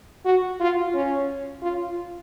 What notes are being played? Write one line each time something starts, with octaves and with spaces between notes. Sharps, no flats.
F#4
F4
C#4
F4